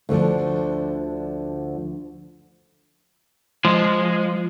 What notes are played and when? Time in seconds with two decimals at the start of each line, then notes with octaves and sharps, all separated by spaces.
0.09 D2 D3 F3
3.65 F3 G#3 D#5